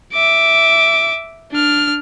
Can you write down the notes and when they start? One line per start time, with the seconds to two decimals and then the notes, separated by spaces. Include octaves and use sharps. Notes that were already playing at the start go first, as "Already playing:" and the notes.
0.14 E5 D6
1.52 D4 F6